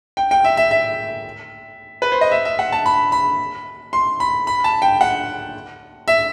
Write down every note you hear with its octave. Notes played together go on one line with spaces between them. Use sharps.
G5
G5
E5
E5
E5
B4
C5
D#5
E5
E5
F#5
A5
B5
B5
C6
B5
B5
A5
G5
F#5
E5